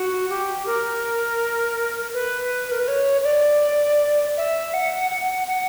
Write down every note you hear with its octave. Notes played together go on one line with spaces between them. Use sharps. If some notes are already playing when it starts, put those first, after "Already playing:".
Already playing: F#4
G4
A#4
B4
A#4
B4
C#5
C#5
D5
E5
F#5
F#5
F#5